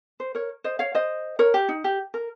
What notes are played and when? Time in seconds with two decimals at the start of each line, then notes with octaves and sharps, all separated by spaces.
0.20 C5
0.35 A#4 C#5
0.64 C5 D#5
0.79 C#5 F5
0.95 C5 D#5
1.39 A#4 C#5
1.54 G4
1.69 D#4
1.84 G4
2.14 A#4